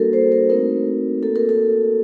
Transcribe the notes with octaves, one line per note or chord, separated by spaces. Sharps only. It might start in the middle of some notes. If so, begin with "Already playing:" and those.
Already playing: G3 A#3 D4 F#4 A4 A#4
C5
A#4
A3 C4 D#4 F#4 A#4
A#3 F#4 A4
A#4
A4